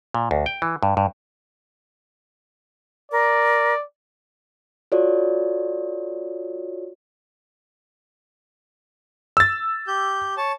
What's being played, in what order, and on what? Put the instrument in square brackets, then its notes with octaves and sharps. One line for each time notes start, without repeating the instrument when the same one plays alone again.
[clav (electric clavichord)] A#2
D2
G5
E3
G2
G2
[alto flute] A#4 [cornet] D5
[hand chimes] F4 F#4 A4 C#5 D5
[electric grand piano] E6 A6
[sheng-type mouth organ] G4 G6
C#5 A5